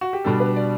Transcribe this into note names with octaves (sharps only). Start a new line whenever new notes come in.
F#4
G4
B2 G3 D4 A4
B4
D5